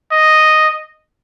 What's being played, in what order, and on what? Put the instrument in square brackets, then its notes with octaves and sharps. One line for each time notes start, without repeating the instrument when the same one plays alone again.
[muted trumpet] D#5